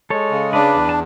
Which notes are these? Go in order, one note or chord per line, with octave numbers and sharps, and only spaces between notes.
G#3 A4 C#5
C#3
D4 B4 D5
E2
A5